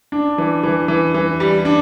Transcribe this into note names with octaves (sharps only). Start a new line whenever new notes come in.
D4
E3
E3
E3
E3
G3
D4